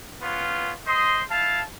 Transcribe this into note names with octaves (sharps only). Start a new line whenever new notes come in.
B3 C#4 F4 B4
C5 D#5 C6 D#6
E4 F5 A5